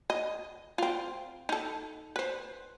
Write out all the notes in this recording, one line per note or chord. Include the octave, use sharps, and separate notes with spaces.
D#5
C4 F4
D#4 A4
B4 C5